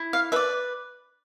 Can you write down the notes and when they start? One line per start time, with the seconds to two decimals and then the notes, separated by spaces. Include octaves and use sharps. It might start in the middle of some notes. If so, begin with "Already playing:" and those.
Already playing: E4
0.13 F5
0.32 B4 D5 E5